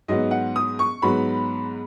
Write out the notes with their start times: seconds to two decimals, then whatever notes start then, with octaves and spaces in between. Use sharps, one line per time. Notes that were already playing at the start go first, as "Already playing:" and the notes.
0.08 G#2 F#3 B3 D#5
0.31 F#5
0.56 D#6
0.79 C#6
1.02 G#2 F#3 B3 B5